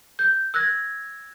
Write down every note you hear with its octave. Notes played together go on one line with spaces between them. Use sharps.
G6
E6 F#6 G#6 A#6